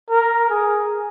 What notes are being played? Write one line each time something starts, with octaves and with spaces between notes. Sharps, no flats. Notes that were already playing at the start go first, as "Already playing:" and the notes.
A#4
G#4